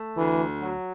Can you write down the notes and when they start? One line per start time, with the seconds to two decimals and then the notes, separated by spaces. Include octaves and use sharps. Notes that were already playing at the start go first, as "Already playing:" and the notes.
Already playing: A3
0.17 D2 E3
0.61 F#3